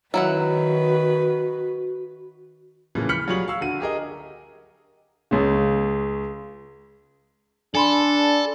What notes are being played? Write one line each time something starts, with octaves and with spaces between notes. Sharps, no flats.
D#3 F#3 E4 F#4 B4 F#5
A#2 C#3 E3 F3 G#3
B5 F6 G6 B6 C#7 F#7
F#3 G3 F4 G#4 C#6 F#7
F5 C#6 E6
D3 F#4 D#7
G4 G#4 A#4 D#5
C#2 C#3
D4 A4 G#5 B5 C6